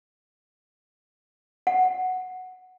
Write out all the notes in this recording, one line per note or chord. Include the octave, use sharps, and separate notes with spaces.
F#5